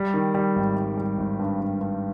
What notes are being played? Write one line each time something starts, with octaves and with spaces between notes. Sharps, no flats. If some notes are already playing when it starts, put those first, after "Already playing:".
Already playing: G3
D#3
G3
G#1
G3
G3
G#1
G2
G2
G2